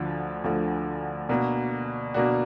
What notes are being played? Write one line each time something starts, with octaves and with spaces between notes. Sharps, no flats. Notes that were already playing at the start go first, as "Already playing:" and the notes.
Already playing: D2 D3 F3
D2 D3 F3
B2 A#3 D4 F#4
B2 A#3 D4 F#4